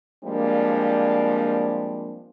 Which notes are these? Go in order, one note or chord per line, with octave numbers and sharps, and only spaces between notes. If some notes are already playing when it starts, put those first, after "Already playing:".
F3 G3 G#3 A#3 C4 D4